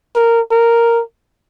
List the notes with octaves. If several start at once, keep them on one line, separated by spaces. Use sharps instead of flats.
A#4
A#4